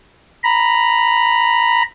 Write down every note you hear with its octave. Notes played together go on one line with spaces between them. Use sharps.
A#5 B5